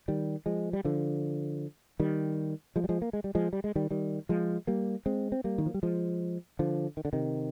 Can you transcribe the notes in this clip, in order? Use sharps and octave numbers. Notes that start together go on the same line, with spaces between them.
D#3 G3
F3 G#3
G3
D3 F3
D#3 G3
F3 G#3
G3
F3 G#3
A#3
G#3
G3
F3 G#3
G3
G#3
D#3 G3
D#3 G3
F3 G#3
G3 A#3
G#3 C4
C4
G3 A#3
D#3
F3
G3
F3 G#3
D3 F3
D#3
D3
C3 D#3